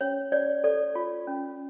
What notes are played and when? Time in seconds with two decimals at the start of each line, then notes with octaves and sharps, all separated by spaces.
0.01 C#4 C#5
0.32 C#5 D5
0.64 A4 D5
0.95 F4
1.27 C#4